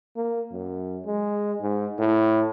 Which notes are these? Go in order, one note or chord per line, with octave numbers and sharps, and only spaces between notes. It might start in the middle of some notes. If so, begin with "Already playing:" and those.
A#3
F#2
G#3
G#2
A2